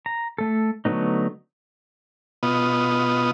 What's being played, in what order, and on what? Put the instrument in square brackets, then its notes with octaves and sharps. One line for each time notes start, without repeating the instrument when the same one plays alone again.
[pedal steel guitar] A#5
A3 A4
D3 F#3 A3 B3 D#4
[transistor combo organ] B2 B3 F4 D#5